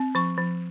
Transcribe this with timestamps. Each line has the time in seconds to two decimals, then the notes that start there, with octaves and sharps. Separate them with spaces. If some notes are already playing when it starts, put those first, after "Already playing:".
Already playing: C4
0.15 F3 C#6
0.38 F3